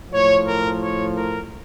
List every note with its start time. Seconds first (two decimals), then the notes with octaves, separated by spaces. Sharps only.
0.11 A2 F3 C#5
0.46 A#4
0.81 C#5
1.15 A#4